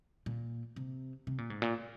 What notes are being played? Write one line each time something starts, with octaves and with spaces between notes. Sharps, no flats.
A#2
C3
C3
A#2
G#2
A#2